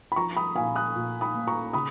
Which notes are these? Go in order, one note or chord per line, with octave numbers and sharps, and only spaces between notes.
B5
F3 A#5 C#6
B5 D#6
A#2 F5 G#5
D#6 F#6
A#2
B5 D#6
A#3
A#5 C#6
C#3 B5 D#6